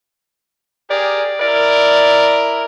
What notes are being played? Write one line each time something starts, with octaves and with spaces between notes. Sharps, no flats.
G4 G#4 A#4 D5
E4 A#4 D5